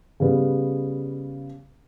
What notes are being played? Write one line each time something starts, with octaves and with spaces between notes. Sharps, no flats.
C#3 G3 B3